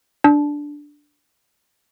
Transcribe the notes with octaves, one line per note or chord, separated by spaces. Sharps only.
D4